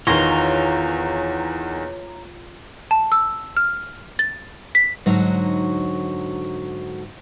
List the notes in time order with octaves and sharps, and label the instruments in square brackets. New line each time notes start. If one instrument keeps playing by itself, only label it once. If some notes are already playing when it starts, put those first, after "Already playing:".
[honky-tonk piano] E2 D#3 [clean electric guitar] F4 [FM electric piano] C#5 A#5
[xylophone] A5
E6
F6
A6
B6
[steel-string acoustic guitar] G#2 D3 F#3 D#4 F#4